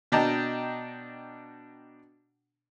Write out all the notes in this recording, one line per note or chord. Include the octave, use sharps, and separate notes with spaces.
B2 D4 D#5 G5 A5 A#5